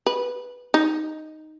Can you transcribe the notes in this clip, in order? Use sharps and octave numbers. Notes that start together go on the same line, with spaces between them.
B4
D#4